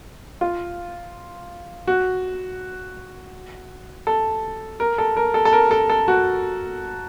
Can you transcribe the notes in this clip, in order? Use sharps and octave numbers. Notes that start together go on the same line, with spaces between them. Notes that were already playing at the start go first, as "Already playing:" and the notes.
F4
F#4
A4
A#4
A4
A#4
A4
A4
A#4
A4
A4
F#4